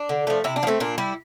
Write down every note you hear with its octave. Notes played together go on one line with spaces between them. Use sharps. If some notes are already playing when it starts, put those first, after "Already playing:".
Already playing: D4
D3
F3 A3
C3 E4
D4
F3
A3 C4
A#2 D4
G3 E4